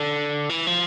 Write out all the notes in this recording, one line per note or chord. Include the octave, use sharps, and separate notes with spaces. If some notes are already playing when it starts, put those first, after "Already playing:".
Already playing: D3
E3
F3